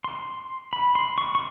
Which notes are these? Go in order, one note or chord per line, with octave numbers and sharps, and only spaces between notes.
C6
B5
C6
C#6
C#6